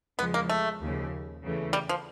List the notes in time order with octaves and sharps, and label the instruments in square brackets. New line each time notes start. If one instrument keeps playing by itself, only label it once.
[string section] E2 C#3 F3 G#3 [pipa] B3
[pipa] A#3
A3
[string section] D#2 C#3 F3
E2 C#3 E3 A3
[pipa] G3
F3